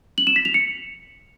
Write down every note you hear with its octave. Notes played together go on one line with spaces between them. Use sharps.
F#7
E7
B6
F7
C#7